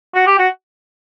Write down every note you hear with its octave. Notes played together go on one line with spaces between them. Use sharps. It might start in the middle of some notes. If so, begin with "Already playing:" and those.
F#4
G4
F#4